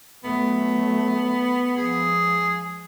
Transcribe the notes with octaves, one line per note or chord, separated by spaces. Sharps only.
F#3 A3 B3
F3 G#3 G#4